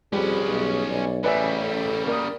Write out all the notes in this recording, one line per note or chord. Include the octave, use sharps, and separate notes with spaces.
F2 G3 C#4 G#4 B4
B1
B1 D5
A1 C#3 G3 B4 D5 E5 G#5
A4
A#3 D5 D#6